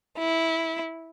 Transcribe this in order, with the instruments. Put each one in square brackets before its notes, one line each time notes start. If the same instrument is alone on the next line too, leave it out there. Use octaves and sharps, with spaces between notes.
[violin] E4